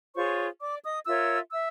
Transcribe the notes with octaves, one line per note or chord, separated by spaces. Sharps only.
F4 G#4 C5 C#5 C#6
D5 D6
D#5 D#6
F4 A#4 C#5 E5 E6
E5 E6